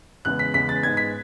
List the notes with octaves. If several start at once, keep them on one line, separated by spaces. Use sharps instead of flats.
E2 C#3 G#3 B3 F#6
B6
E2 C#3 G#3 B3 B6
A6
G#2 G#3 B3 G#6
B6